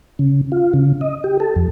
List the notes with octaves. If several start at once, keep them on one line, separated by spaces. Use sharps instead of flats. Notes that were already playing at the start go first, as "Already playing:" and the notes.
C#3
F4
C#3
D#5
G4
A4
F2